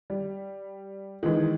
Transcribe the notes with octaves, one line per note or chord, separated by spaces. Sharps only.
G3
D#3 E3 G#3